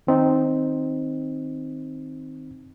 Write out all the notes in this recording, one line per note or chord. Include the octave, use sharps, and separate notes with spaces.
D#3 C4 D#4